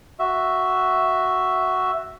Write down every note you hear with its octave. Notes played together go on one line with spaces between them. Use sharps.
F#4 E5